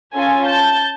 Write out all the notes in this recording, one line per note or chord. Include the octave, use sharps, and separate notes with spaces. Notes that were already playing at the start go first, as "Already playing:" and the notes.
C#4 F4 A4 G#5
A5 G6